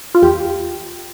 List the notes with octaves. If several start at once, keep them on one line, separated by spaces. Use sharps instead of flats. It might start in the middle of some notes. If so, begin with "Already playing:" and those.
F4
E2 G4